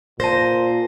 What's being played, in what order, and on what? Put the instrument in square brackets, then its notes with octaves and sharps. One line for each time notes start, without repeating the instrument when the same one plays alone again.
[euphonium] A#2 [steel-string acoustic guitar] C5 [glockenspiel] A5 A#6